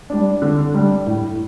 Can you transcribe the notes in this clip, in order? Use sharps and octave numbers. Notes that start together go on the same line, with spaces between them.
G3 D4
D3
G3 D4
A2